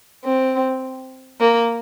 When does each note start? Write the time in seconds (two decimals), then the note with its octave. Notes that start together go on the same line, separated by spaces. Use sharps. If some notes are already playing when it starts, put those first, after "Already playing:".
0.24 C4
1.40 A#3